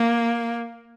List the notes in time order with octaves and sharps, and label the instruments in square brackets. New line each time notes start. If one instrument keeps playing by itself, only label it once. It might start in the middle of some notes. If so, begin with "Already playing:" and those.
Already playing: [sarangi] A#3